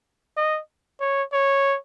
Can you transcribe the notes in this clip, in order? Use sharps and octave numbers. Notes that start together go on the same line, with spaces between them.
D#5
C#5
C#5